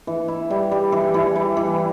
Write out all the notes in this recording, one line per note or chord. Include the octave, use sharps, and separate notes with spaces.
E3
E4
G3
G3
E3
E3
G3
E3